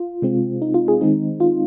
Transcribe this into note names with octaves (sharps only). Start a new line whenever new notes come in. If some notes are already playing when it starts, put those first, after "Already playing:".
Already playing: F4
C3 G#3 C4
D#4
F4
G#4
D#3 G#3 C4 D#4
F4